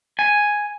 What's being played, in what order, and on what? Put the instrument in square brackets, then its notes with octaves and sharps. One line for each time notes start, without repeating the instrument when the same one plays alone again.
[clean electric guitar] G#5